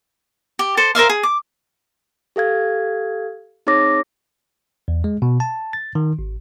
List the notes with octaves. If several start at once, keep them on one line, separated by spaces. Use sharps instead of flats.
G4
A4 C5
A#4 C5 E5 F5
G#4
D6
G4 A4 F5 G#6
C4 D#4 G#4 C#5 D6 A#6
E2
G#3
B2
A5
A6
D#3
G#1